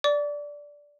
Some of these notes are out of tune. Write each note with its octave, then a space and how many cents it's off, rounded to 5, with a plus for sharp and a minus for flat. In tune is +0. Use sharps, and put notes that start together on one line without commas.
D5 -10 D6 -40